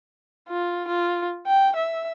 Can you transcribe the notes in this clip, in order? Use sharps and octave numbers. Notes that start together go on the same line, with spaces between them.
F4
F4
G5
E5